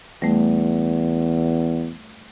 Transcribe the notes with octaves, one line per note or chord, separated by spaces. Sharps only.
E2 G3 A3